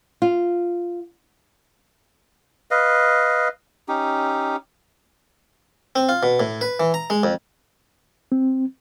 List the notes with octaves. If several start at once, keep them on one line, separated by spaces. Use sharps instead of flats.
F4
B4 D#5 F5
C#4 D#4 G4
C4
F4
B2
A2
B4
E3
A#5
G#3
F2
C4